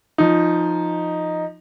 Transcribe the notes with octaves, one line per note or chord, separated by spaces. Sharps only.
F3 D#4